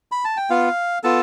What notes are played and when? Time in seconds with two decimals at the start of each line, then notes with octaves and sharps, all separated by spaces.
0.12 B5
0.25 A5
0.37 G5
0.50 B3 F4 F5
1.03 B3 F4 A4 A5